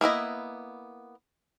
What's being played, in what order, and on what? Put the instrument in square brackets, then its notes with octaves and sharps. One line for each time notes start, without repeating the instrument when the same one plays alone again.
[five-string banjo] A#3 B3 E4 D#5